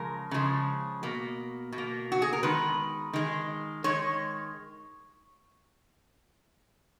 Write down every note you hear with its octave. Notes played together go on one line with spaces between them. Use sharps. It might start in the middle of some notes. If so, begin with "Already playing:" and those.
Already playing: C#3 F3 G#3 A#4
C#3 F3 G#3
B2 A#3
B2
A#3
F#4
G#4
A#4
D#3 G#3 B4
D#3 G#3
D#3 G#3 C#5